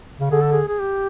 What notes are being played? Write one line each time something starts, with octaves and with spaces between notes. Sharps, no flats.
C#3
D3 G#4
A4
G#4
G#4
G4